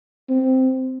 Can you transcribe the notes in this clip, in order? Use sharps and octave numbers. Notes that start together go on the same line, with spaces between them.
C4